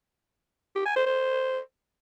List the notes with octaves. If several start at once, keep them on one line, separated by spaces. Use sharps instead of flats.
G4
G#5
C5
C5